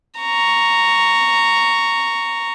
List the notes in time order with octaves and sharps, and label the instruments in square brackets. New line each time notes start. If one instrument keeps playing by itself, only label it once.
[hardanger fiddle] A#5 C#6